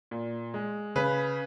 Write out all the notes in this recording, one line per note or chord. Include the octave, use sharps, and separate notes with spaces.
A#2
G#3
C#3 B4